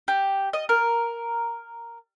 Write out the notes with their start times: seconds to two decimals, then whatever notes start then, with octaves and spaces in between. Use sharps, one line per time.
0.08 G4
0.53 D#5
0.69 A#4